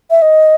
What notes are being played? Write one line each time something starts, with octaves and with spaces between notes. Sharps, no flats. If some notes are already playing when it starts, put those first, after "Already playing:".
E5
D#5